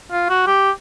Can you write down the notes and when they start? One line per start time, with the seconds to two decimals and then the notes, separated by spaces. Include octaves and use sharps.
0.11 F4
0.30 F#4
0.47 G4